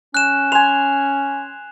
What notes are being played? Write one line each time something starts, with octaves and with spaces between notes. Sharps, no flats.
C#4 F#6 E7
G#5 C6 F7